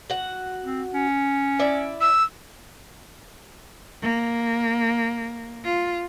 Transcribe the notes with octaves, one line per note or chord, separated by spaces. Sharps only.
F#4 F#5
C4
C#4
E4 D5 E5
E6
A#3
F4